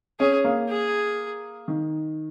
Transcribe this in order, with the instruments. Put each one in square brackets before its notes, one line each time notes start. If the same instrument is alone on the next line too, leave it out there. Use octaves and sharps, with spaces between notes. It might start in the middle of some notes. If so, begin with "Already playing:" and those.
[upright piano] C#4 [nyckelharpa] G#4
[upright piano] A#3
[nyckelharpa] G#4
[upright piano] D#3